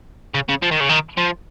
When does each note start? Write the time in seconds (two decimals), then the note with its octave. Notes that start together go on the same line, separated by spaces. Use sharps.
0.34 C#3
0.49 C#3
0.62 F3
0.71 D#3
0.80 C#3
0.89 D#3
1.18 F3